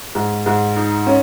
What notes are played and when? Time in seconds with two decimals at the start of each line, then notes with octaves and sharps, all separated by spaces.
0.15 G#2
0.46 G#2
0.77 D#4
1.07 C#4